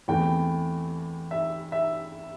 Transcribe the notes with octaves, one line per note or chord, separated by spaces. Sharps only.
E2 E3 A3 C4 G5
E5
E5